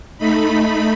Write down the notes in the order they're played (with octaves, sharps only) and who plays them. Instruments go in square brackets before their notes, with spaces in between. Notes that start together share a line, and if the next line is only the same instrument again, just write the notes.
[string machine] A3 D#4 B5